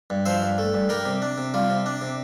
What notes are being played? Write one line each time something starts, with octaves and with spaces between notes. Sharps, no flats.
G2
F3 C5 E5
G2
A3
G2
G3 G4 A#4
C3
D4
C3
G3 F4
C3
D4
C3